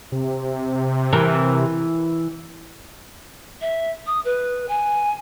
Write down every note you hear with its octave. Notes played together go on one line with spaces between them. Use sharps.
C3
E3 A#4
E5
D#6
B4
G#5